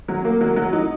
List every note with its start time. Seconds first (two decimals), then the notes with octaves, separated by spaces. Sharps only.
0.08 F#3
0.25 A#3
0.41 F#3
0.56 F#3
0.73 D#4